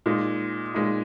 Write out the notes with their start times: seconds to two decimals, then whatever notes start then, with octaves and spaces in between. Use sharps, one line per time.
0.06 A#2 G#3 D#4
0.75 A#2 G#3 D#4